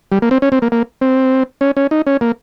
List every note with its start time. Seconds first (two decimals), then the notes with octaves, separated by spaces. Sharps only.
0.12 G3
0.22 A#3
0.31 C4
0.42 C#4
0.52 C4
0.62 A#3
0.72 A#3
1.01 C4
1.61 C#4
1.77 C#4
1.91 D#4
2.07 C#4
2.21 A#3